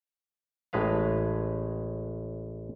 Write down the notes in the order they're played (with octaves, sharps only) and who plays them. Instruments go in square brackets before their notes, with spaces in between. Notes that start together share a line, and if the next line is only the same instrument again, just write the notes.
[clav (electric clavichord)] A1 A2 G#3 B4 F5